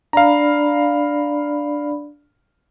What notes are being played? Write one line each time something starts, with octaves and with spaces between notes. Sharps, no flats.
D4 D5 F5 A#5 B5